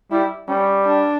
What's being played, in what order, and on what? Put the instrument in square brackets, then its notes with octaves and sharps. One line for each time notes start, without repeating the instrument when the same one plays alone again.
[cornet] G3 [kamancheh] E4
[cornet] G3 [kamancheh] C#4
[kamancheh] D4